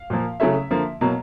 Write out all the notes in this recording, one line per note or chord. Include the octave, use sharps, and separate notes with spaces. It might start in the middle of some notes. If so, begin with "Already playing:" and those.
Already playing: F5
A#2 F3 A#3
C#3 F#3 A3 C#4 E5
D3 F3 A#3
B2 F#3 A#3